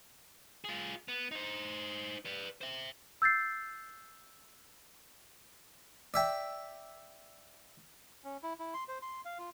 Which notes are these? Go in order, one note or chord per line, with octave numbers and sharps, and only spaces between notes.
F4 G#4
B3
D#4 C5
B4 D5
C5 E5
E6 G6 A6 C7
D5 E5 G5
C#4
E4
E4
C6
C5
C6
F5
F4